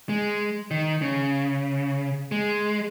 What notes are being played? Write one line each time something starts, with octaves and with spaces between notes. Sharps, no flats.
G#3
D#3
C#3
G#3